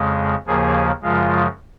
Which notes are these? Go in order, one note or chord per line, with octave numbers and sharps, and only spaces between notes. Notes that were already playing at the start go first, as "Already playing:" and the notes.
Already playing: F2 C#3 G#3
D#2 C#3 F3 A#3 G#4
F#2 C#3 F3 G#3 F4